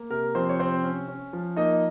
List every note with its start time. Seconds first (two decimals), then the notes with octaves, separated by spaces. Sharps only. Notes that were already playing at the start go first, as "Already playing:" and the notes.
Already playing: A#3
0.10 C3 A#4
0.35 F3 C4 C5
0.49 C#5
0.59 C3 C4 C5
0.83 C#4
1.08 C#4
1.33 F3
1.56 A#3 D#4 D#5